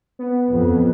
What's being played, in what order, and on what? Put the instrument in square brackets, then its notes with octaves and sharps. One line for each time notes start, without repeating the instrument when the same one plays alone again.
[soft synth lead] B3
[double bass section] F2